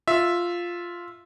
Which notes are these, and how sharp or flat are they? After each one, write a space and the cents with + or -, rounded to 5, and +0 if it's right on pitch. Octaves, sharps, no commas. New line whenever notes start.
F4 +0 E5 +0